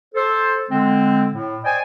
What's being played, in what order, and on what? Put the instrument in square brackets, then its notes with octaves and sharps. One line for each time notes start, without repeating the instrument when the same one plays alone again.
[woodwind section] A4 C5
D3 G#3 C4
A2
C5 D5 D#5 G5 G#5